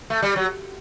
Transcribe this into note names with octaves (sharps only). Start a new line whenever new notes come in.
A3
G3
F#3